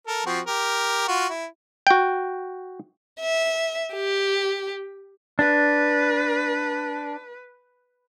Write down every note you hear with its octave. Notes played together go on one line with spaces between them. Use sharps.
A4 A#4
F3 C4 F#4
G4 A#4
F4 F#4
E4
F#4 G5
E5
G4
D4 B4